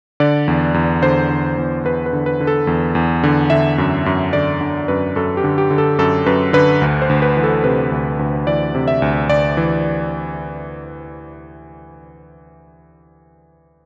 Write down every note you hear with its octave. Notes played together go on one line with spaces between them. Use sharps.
D3 D5
E2
E2
D3 C5
D3
E2
E2 B4
B4
D3
B4
D3
A4
E2
E2
D3
D3 E5
F#2
F#2
D3 D5
D3
F#2 B4
F#2 A4
G4
D3
G4
D3
A4
F#2 A4
F#2 B4
D3 B4
D2
C5
D2
B4
E3
A4
C3 B4
D2
D2
E3 D5
C3
E5
D2
D2 D5
E3